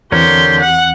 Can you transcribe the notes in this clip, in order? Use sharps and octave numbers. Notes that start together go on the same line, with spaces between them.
E2 D3 E3 C4 G4 A#4 C#5 C6
F#5